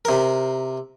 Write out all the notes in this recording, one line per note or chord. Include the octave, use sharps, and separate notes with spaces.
C3 A#4